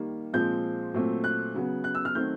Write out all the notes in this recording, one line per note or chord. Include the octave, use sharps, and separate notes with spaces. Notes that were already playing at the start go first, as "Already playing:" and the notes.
Already playing: D#3 G3 A#3
A#2 F3 G#3 C4 G6
A#2 F#3 A3 C4
F#6
C#3 F#3 B3
F#6
E6
F6
D#3 F#3 A3 C4 G6